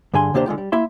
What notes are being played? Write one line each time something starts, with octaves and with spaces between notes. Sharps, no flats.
G2 D3 G#4 G#5 C6
D#2 C3 A#3 D4 G4 C5
D3 G#3 F4 G4
G3
A#3 E4 E5 C6